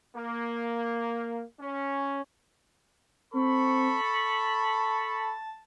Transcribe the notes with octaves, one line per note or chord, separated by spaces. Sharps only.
A#3
C#4
C4 A4 B5 C#6
A5